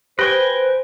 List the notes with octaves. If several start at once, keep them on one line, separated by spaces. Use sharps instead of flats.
G4 B4 C5 G5 G#5 A#6